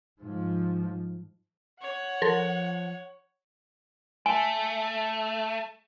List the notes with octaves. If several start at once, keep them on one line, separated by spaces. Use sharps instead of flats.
G#2 F3
C#5 F#5
F3 A4 A#4 C6
A3 G#5